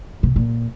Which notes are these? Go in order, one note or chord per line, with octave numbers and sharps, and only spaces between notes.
C3
A#2